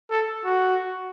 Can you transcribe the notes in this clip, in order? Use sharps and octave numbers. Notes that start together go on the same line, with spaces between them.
A4
F#4